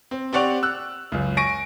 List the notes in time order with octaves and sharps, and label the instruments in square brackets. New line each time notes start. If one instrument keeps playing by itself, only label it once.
[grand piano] C4
C4 G4 D5 F#5 C#6 F7
E6 F#6
C#2 F#2
G#5 C#6 A#6 D7